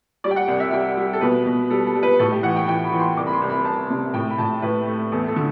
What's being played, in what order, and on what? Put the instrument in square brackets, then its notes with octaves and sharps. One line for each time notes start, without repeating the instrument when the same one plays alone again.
[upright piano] G3 D5
G5
F#5
C2
E5
G3 G5
G3
A4
B2 B4
B2
G3 A4
A4
G3
B4
A2 A4
G4
E3 F#5
G5
E3 G5
B5
E3
C6
C2 D6
B5
C6
C2
B5
C2 A5
C3
A2 G5
B5
A2 A5
A2 B4
A3
E2 A4
A4
D3